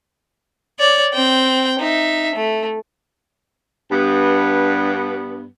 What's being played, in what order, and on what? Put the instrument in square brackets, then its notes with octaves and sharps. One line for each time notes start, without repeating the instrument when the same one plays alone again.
[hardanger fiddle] C#5 D5
C4 G5
D#4 E5
A3
[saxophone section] G2 B3